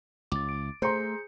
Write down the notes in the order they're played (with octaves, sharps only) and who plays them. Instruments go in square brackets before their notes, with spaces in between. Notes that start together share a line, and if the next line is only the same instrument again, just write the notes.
[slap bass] C#2 [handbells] D6 A6
[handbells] D7
[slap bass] A3 [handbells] G#4 G6 C#7 [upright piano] C5 A#5 C6